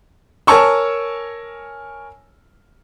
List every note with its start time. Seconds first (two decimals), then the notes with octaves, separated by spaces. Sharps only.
0.47 A#4 C#5 G#5 A5 C#6 E6